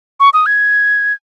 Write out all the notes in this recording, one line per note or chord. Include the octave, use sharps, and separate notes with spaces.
C#6
D#6
G#6